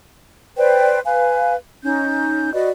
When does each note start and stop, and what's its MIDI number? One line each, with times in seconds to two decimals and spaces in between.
0.57 0.99 71
0.57 0.99 72
0.57 0.99 74
0.57 0.99 79
1.04 1.53 71
1.04 1.53 77
1.04 1.53 80
1.83 2.52 61
1.83 2.52 63
1.83 2.52 91
2.53 2.69 66
2.53 2.69 71
2.53 2.69 74
2.53 2.69 75